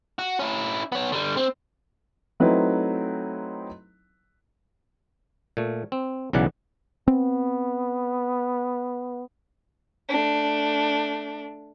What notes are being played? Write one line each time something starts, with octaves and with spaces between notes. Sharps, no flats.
F#4
C#4 E4
B3 C#5
D3 G3
C4
F#3 A3 C4 D#4 E4 B4
A#2 A3
C4
B1 C#3 E3 D5 F#5
B3 C4
A3 D4